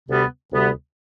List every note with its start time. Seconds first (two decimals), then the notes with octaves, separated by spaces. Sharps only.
0.07 D2 C3 G3 B3
0.52 D2 C3 G3 B3